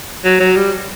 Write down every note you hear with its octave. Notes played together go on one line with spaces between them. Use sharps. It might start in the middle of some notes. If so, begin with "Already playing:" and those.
F#3
F#3
G3